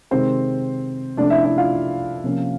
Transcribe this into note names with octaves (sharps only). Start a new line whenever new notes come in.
C3 D#3 G#3 C4 C5
C3 F3 A3 C#4 D4 D5
E4 E5
E4 E5
F4 F5
C3 F3 A#3 C#4